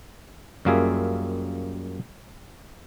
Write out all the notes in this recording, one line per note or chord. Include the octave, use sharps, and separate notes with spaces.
F#2 G3 A#3 F4 G#4 E5